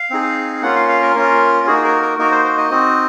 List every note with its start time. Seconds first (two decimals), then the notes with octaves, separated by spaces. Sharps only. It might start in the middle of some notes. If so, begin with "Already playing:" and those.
Already playing: F5
0.10 C4 D#4 G#4
0.62 A#3 C#4 F4 F#5
0.76 F5
0.89 F5
1.02 A#4
1.15 A#3 C#4 F4
1.67 A#3 D#4 F#4 G#4
1.84 A#4
2.02 A#4
2.19 A#3 D#4 F#4 A#4
2.32 C5
2.45 C5
2.58 D#5
2.71 C4 D#4 F#4